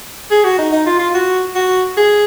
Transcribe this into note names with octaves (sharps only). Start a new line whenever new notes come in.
G#4
F#4
D#4
D#4
F4
F4
F#4
F#4
G#4